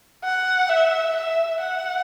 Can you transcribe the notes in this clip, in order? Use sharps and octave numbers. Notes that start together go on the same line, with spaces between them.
F#5
E5
E5
F#5